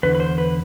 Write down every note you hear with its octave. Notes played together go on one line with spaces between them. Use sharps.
E2 D3 B4
B4
C5
B4